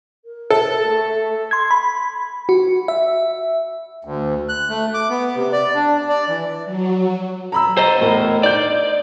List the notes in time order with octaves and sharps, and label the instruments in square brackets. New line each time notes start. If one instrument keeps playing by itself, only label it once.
[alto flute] A#4
[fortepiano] A4
[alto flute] A3
[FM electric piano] C6 G#6
B5
F#4
E5
[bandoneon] D2
F#6
A3
D6
B3
C3
D5
D4
D5
E3
[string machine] F#3
[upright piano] A#5 B5 E6
[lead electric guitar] C5 D#5 [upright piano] A#5
[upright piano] E2 A2 A#4
[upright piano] D#4 G6 [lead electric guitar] D5